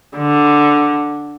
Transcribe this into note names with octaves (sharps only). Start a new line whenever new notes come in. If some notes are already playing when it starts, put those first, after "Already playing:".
D3